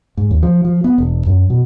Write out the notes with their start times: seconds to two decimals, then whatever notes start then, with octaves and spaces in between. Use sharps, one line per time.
0.17 G#2
0.31 D#2
0.43 F3
0.65 F3
0.84 B3
0.98 E1
1.27 F#2
1.50 B2